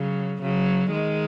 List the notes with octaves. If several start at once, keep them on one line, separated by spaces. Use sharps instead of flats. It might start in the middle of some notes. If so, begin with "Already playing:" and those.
Already playing: C#3 F#3
C#3 F#3
D#3 G#3